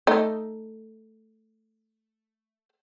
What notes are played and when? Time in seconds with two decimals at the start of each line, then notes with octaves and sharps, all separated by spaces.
0.07 A3 D#4